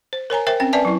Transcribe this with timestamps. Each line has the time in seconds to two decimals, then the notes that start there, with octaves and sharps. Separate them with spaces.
0.13 C5
0.30 A#4 C#5 G#5 A#5
0.47 A#4 C5 E5 G5
0.60 C4 C#4 G5
0.73 B4 D5 E5 G#5 A5
0.85 F#3 E4